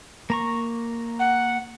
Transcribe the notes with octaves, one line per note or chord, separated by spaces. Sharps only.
A#3 A#5 C#6
F#5